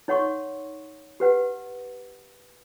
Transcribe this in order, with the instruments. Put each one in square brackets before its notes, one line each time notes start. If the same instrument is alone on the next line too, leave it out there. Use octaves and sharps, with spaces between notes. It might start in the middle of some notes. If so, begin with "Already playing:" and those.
[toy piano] D#4 C#5 F#5 C6 C#6
G4 B4 F#5